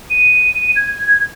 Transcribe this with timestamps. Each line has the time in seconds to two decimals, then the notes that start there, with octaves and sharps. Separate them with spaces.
0.10 D#7
0.76 G#6